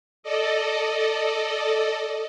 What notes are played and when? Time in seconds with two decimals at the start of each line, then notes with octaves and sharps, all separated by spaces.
0.23 A4 D5 D#5